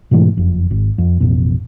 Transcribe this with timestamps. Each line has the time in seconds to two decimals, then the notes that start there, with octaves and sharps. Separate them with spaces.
0.11 G#2 B2 E3 A3
0.37 F#1 F2
0.71 G#1
0.98 F2
1.20 A1 F2 B2